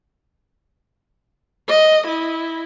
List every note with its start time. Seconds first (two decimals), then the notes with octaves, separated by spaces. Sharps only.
1.69 D#5
2.07 E4